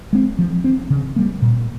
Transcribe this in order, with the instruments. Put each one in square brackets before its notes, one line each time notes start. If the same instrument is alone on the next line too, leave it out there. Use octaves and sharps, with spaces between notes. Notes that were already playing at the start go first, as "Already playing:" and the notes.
[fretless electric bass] G#3 C4
F3
C4
C#3
G3 A#3
A#2